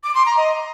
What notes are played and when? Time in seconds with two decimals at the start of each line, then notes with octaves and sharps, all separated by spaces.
0.04 D6
0.15 C6
0.26 A#5
0.37 D#5